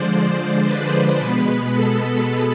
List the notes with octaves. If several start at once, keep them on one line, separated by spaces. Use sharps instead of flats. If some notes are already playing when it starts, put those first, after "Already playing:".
Already playing: D3 F3 G#3 C5 D5
C5
B4
B2 G#3 B3
A4